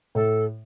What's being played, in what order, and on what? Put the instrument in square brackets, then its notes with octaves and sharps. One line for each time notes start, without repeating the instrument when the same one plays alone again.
[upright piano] A2 [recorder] A4